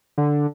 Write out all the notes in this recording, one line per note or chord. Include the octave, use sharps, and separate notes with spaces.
D3